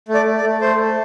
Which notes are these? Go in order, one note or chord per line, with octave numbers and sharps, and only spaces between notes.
A3
D5
A3
D5
A3
A3 C5
A3